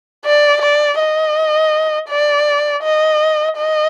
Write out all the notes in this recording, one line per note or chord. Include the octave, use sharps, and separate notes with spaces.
D5
D5
D#5
D5
D#5
D#5